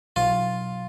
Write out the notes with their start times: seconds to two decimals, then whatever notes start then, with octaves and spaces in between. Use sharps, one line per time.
0.16 B1 F4